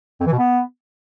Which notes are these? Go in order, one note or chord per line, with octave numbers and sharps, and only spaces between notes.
F2
E3
B2
B3